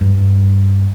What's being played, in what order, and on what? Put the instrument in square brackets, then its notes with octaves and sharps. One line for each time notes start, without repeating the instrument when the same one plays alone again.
[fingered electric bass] G2